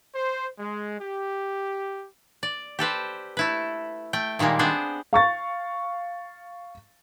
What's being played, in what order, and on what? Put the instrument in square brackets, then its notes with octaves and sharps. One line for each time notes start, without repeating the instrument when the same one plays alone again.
[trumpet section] C5
G#3
G4
[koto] D5
G4 A4 B4 C5
A3 E4 B4
A3 G5
A#2 D#3 G3 G#3 A#3
B3 C4 D4 G#4 C5
[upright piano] F5 C#6 A6